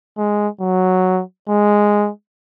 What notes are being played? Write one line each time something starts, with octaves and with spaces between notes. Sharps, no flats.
G#3
F#3
G#3